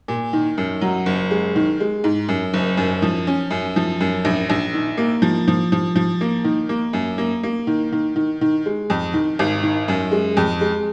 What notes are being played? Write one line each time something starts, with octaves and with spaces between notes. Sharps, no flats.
A#2
D#3
F#2
F#3
F#1
G#3
D#3
G#3
G#2
F#2
F#1
F#2
F3
C#4
F#2
F3
F#2
A#1
A#1
D#3
A#3
F3
F3
F3
F3
A#3
D#3
A#3
F#2
A#3
A#3
D#3
D#3
D#3
D#3
G#3
F2
D#3
G#1
D#3
F#2
G#3
F2
G#3